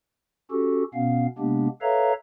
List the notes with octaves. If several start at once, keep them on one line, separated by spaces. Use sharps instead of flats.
C#4 F#4 G4 A4
B2 B3 C#4 F5
C3 G#3 A#3 B3 D4 G4
A4 B4 C#5 E5 F5 A#5